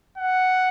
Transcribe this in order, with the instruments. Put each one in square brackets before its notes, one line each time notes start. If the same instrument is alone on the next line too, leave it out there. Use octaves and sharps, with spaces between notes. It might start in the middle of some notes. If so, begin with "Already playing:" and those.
[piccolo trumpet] F#5